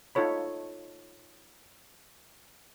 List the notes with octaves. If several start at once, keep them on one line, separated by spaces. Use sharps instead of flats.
D#4 F4 A4 C#5 B5